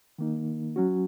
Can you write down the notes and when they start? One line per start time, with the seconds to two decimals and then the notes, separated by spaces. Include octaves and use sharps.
0.18 D#3 A#3 D#4
0.76 F#3 C#4 F#4